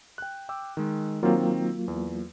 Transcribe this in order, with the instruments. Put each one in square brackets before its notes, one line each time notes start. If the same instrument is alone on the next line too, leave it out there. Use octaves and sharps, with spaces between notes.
[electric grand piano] G5 F#6
G5 D6 E6
D#3 G#3
[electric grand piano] D#3 C4 [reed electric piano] F#3 A#3 F4
[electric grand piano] E2